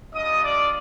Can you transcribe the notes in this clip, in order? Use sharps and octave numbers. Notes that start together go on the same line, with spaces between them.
G3 D4 F4 D#5 D#6
D5 D6